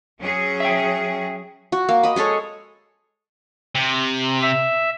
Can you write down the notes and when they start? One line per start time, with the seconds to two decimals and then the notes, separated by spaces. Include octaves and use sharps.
0.19 F#3 C#4 G#4
0.60 E5 G5
1.72 F#4
1.89 A#3
2.03 D#5 B5
2.16 G#3 G#4 A4 C#5
3.75 C3
4.42 E5